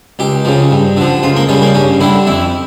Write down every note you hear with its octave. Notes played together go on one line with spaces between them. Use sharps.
C#2 G4
C#3 F3
G2
D3 F3
C#2 F4
A#3
C#3 G3 C#4
A#3
G2 C#4
D3 G3 E4
F2 E4